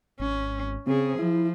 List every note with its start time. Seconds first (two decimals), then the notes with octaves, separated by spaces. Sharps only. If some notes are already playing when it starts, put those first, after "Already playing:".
0.20 G#1 C#4
0.87 C#3 C4 G#4
1.19 F3 E4